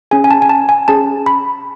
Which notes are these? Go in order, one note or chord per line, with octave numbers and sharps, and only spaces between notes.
C#4 G#4 G#5
G#5
A5
G#5
A5
G#5
C#4 G#4 A5
B5